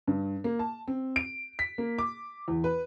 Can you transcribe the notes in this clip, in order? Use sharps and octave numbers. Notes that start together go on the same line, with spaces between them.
G2
A#3
A5
C4
D7
B6
A#3
D6
E2
B4